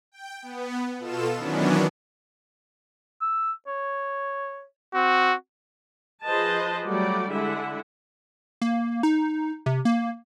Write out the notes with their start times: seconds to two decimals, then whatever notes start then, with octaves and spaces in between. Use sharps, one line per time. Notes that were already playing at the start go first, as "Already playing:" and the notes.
0.12 G5
0.42 B3
0.98 B2 F4 A4 E7
1.37 D#3 E3 F#3 B3 C#4 D4
3.21 E6
3.67 C#5
4.95 C4 F#4
6.26 F3 G#4 B4 C5 D#5 A5
6.87 F#3 G3 A3 F#4 D5
7.31 D3 G#3 E4 E5 F#5
8.62 A#3
9.03 D#4
9.66 C3
9.85 A#3